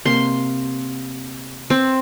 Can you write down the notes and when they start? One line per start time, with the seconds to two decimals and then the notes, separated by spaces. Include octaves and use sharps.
0.06 C3 A#3 C6
1.70 C4